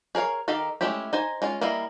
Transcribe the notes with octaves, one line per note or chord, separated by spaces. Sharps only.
G#4 A#4 C#5 F5
D#3 D#4 G4 A4 F5
G#3 A3 C#4 E4 G4
D#4 C5 G#5
G#3 C#4 F4
G3 A#3 E4 D#5 F5